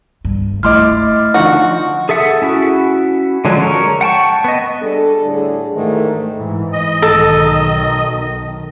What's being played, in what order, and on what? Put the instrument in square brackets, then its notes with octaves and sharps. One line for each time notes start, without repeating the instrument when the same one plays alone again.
[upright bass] G2
[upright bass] A3 [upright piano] E4 D6 [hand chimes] D#5 C6 F6
[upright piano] D3 F3 D#4 [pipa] F#4
[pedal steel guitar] G#4 A4 E5 F#5 D#6
C#4 E4 F#4
D3 F3 F#3 G#3 D4
A#4 C#5
F#5 G5 A5 C#6
B3 D#5
[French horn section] G3 D4 G#4 A4
A2 D3 G3 D4 G#4
G#2 D#3 E3 A3
[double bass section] G#2 E3
[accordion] D#5
[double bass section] B1 D#3 [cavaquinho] A4